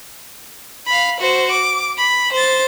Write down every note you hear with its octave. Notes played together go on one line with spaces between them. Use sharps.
F5 B5
F#4 C5
D6
B5
C5 A6